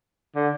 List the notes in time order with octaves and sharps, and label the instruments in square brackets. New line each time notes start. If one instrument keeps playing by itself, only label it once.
[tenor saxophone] D3